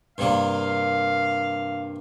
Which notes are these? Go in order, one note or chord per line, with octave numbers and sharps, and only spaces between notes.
G2 C3 A#3 F5